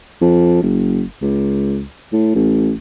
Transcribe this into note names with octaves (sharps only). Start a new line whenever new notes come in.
F2
F#1
C#2
A2
A1